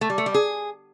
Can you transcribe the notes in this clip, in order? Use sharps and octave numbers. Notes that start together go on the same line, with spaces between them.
A3
G3
A3
G3
G#4